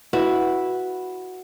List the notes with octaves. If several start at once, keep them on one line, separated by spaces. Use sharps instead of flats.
E4 F#4 B4